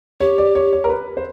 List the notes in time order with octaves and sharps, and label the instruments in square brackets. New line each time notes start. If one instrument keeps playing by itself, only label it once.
[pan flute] G4 [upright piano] C#5
[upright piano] D5
C#5
C#5
A#4
B4
C5